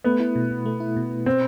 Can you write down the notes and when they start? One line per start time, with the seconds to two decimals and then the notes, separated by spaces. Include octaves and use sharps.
0.04 A3 B3
0.20 E4
0.36 B2
0.51 B2
0.66 A3
0.80 E4
0.97 B2
1.11 B2
1.26 B2 C4